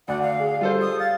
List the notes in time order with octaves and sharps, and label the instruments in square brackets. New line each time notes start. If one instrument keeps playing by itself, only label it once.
[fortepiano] D2 [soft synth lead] D5 [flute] F#5
[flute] F5
[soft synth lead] G#4
[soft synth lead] G3 [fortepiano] F4 A4 C5
[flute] D#6
[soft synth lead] F5 [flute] A6